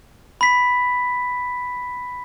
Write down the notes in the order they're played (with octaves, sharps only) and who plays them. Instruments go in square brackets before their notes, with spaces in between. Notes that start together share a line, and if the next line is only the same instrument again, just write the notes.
[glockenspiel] B5 B6